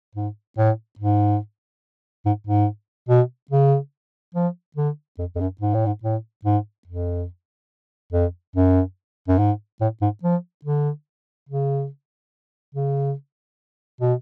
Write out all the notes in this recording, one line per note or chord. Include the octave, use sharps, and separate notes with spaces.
G#2
A2
G#2
G#2
G#2
B2
C#3
F3
D3
F2
F2
F#2
G#2
A2
G#2
A2
G#2
F2
F2
F#2
F#2
G#2
A2
G#2
F3
D3
C#3
C#3
B2